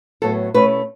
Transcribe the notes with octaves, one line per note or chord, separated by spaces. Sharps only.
A2 F#3 B3 A4
B2 A3 C#4 E4 B4